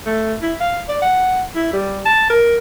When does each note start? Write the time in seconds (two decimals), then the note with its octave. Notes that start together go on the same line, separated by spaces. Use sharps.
0.06 A3
0.42 E4
0.60 F5
0.88 D5
1.02 F#5
1.55 E4
1.73 G3
2.06 A5
2.30 A#4